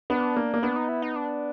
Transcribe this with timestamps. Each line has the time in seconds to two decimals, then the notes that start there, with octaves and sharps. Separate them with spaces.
0.10 B3 D4
0.36 A#3
0.54 A#3
0.63 B3 D4
0.76 D#4
0.89 E4
1.02 D#4
1.16 D4